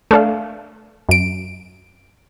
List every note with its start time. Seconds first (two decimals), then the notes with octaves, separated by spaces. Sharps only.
0.11 A3 D4 A4 F5
1.09 F#2 D7